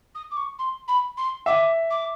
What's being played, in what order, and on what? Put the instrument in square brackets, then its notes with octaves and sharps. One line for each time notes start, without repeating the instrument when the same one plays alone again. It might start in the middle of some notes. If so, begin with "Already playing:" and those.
[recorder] D#6
D6
C#6
C6
B5
C6
[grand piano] E5 [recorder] D6
[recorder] D6